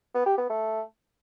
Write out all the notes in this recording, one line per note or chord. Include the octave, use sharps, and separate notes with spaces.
B3
G4
B3
A3